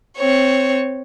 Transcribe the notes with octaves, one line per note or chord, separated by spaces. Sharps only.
C4 C#5